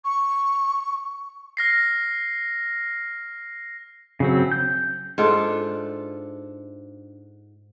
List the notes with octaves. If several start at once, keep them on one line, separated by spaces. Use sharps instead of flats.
C#6
F6 A#6 C7
C#3 F#3 C4
G6
G#2 D4 F4 A4